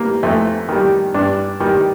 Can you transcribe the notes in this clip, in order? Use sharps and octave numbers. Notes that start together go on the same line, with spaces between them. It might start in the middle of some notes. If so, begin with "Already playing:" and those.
Already playing: G3 A#3
F2 A3
D#3 G3
G2 D4
D#3 G3